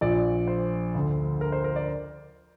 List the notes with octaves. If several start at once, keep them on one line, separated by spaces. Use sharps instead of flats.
A#1 A#2 D5
C5
D2 D3
A#4
C5
A#4
D5